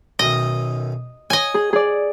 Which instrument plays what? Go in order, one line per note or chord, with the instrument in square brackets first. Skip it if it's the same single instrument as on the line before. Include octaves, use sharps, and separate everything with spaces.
[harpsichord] B1 F#2 D#3 [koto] D#5
[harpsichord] C#5 [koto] D#5 G#5
[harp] G#4
G#4 D5